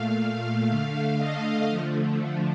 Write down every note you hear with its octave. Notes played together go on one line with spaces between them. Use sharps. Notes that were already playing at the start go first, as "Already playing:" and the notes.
Already playing: A#2 A3 F5
D3 A3
D#5
D3 F3 A3